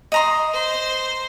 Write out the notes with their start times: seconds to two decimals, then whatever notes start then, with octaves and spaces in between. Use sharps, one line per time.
0.12 D#5 A#5 C6
0.54 C5